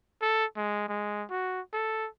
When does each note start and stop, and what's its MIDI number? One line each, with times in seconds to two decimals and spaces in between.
0.22 0.45 69
0.57 0.88 56
0.89 1.24 56
1.30 1.61 66
1.73 2.08 69